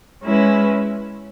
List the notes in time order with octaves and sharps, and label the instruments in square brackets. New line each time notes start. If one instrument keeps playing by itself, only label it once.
[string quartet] G#3 C#4 E4 B4